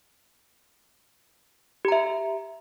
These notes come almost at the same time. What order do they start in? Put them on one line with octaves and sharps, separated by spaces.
G4 A#5 E5